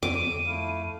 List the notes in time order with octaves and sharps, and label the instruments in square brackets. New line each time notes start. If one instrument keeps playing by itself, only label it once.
[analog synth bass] F2 [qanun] D6 [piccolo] D#7
[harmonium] A3 E4 F5